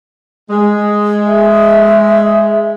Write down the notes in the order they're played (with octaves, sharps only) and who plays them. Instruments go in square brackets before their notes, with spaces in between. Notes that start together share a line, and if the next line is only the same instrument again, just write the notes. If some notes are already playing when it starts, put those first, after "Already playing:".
[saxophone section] G#3
[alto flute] E5